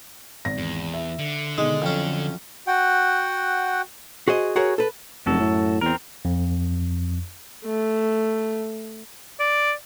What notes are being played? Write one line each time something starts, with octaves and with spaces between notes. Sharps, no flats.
G#1 A#6
E2
E5
D3
B2 D#3 G#3
F2 F#3 C#4
F#4 F#5 G5
F#4 G#4 C5 D#5
F#4 G#4 A#4 C#5
A4 B4
F1 F#2 F#4 A4
A2
E2 C4 A#4
F2
A3
D5